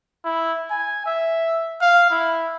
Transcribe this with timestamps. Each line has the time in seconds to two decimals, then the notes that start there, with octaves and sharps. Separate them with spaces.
0.24 E4
0.71 G#5
1.06 E5
1.81 F5
2.10 E4